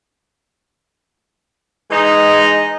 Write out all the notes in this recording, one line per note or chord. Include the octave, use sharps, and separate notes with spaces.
E3 G#3 D#4